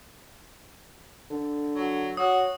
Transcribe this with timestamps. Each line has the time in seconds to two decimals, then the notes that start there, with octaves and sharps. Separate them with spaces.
1.30 D3
1.74 F#3
2.17 F#4 C#5 D#6